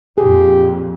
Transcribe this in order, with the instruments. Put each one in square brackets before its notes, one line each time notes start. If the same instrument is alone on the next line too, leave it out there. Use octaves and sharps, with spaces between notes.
[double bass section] F2 A#2 [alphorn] G4 [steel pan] G#4